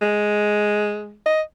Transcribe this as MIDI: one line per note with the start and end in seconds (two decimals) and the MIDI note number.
0.01 1.17 56
1.26 1.42 75